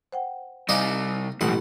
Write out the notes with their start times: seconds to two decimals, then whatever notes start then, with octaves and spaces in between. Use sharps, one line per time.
0.13 C5 F#5 G5
0.69 C3 G3 D#4 D5 D#5 F5 G#5
1.41 A1 F2 G#2 B2 F#3 F#5